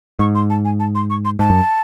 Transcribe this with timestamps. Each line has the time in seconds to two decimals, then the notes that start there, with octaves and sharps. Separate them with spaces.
0.19 G#2 C#6
0.35 C6
0.50 A5
0.65 G#5
0.80 A5
0.95 C6
1.10 C#6
1.25 C6
1.39 G#2 A5
1.50 F#2